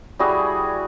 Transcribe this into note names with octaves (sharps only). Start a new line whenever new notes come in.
G3 E4 F#4 G#4